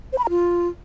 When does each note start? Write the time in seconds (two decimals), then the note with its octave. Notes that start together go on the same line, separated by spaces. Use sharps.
0.13 C5
0.18 B5
0.24 A#5
0.30 F4